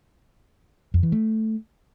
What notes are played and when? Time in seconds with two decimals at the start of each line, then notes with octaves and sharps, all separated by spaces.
0.94 F2
1.03 E3
1.12 A3